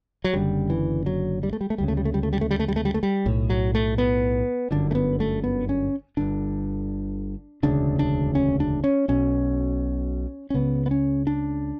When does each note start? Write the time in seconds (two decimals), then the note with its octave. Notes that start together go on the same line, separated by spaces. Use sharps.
0.24 F#3
0.33 F#1 F#2 D3 G3
0.70 E3
1.06 F#3
1.43 G3
1.53 A3
1.61 G3
1.70 A3
1.78 D2 C#3 G3
1.88 A3
1.97 G3
2.05 A3
2.14 G3
2.23 A3
2.33 G3
2.41 A3
2.51 G3
2.59 A3
2.68 G3
2.76 A3
2.85 G3
2.94 A3
3.03 G3
3.26 B1 A2
3.50 F#3
3.75 A3
3.98 B3
4.71 G1 F#2 D3 D4
4.91 A3
4.95 B3
5.20 A3
5.44 B3
5.69 C#4
6.17 G1 G2 D3 D4
7.63 E1 D2 C#3 D4
7.99 D4
8.35 C#4
8.60 D4
8.84 C#4
9.08 B1 B2 C#4
10.50 C#4
10.54 C#2 C#3 B3
10.86 B3
10.91 C#4
11.27 D4